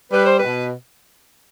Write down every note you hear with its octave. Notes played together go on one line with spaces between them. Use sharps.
G3 B4
C5
B4
B2